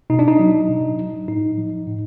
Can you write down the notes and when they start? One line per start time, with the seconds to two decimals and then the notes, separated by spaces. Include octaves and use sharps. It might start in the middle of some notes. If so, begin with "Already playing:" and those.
0.10 B2 D#4
0.19 D4
0.28 D#4
0.39 F#3
0.69 B2
0.98 F#3
1.28 A2 D#4
1.58 F3
1.87 A2